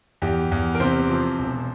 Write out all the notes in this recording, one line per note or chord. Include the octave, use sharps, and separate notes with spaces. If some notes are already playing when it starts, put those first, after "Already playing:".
E2 G4
E2
A#4
C3 C5
F3
E1